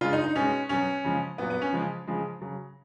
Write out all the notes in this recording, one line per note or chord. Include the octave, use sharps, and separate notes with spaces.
C#3 G#3 F4
D#4
D#4
B2 G#3 C#4
B2 F#3 C#4
C#3 F3 G#3
A#2 F#3 B3
B3
C#4
C#3 F3 G#3
C#3 F3 G#3
C#3 F#3